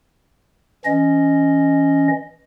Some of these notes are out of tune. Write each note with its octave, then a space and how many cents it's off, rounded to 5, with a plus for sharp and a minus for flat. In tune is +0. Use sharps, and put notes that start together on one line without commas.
E3 +0 C#4 +0 D#5 +0